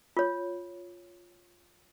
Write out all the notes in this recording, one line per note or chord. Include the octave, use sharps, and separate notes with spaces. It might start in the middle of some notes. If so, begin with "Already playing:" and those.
F4 C#5